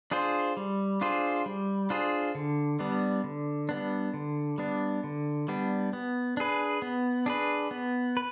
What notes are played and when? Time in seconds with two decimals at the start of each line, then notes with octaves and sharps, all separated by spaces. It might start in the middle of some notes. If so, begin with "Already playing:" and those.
0.11 D4 F4 G#4 C5
0.57 G3
1.01 D4 F4 G#4 C5
1.46 G3
1.90 D4 F4 G#4 C5
2.35 D3
2.79 G3 B3 D4
3.24 D3
3.69 G3 B3 D4
4.14 D3
4.58 G3 B3 D4
5.04 D3
5.48 G3 B3 D4
5.93 B3
6.37 D4 G#4 B4
6.82 B3
7.26 D4 G#4 B4
7.71 B3
8.17 B4